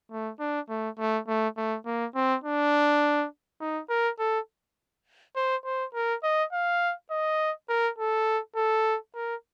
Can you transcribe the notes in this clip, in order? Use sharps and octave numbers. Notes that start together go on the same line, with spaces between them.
A3
D4
A3
A3
A3
A3
A#3
C4
D4
D#4
A#4
A4
C5
C5
A#4
D#5
F5
D#5
A#4
A4
A4
A#4